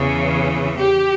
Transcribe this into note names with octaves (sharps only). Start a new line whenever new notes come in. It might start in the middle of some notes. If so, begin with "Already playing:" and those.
Already playing: E2 C#3 E3
G4